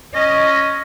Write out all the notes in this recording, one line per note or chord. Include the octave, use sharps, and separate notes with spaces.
C#4 D#5